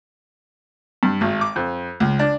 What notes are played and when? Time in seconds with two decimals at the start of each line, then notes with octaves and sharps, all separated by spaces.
1.03 G2
1.21 G#1
1.41 D6
1.56 F2
2.00 C#2
2.19 D4